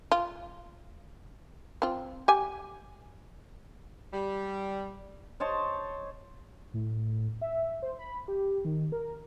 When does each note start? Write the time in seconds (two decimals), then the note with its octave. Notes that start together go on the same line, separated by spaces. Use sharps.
0.12 F4
1.82 C4 F4
2.28 G4 G#5
4.13 G3
5.40 C5 C#5 D#5 A5
6.74 A2
7.42 E5
7.82 C5
7.99 B5
8.28 G4
8.65 D#3
8.92 A#4